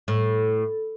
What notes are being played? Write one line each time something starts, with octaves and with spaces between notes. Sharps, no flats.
A2